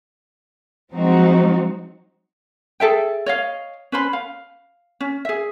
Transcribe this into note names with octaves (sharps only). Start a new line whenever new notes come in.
F3 F#3 G#3 C4 D#4 F#4
G#4 A4 E5 G5
C#5 D#5 F5
C#4 B4 C5 B5
F5
C#4
G#4 E5